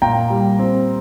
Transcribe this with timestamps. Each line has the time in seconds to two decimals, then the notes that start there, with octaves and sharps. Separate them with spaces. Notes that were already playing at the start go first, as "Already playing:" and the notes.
0.02 A#2 G5 A#5
0.30 G3
0.59 C4